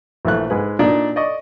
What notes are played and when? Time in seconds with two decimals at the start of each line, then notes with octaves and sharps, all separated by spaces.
0.25 A#1 E3 A3 F#6
0.50 G#2 G#3 B4
0.79 A#2 D4 D#4 D5
1.16 D5 D#5 C#6